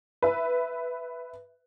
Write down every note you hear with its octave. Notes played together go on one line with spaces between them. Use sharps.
B4 E5